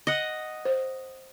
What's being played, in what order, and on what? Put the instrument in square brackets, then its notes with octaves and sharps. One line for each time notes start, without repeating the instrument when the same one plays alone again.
[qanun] D#5 F#5
[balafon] C5